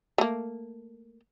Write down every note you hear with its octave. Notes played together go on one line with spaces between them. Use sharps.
A3 A#3